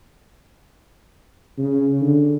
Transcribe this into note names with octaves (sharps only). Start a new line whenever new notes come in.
C#3
D3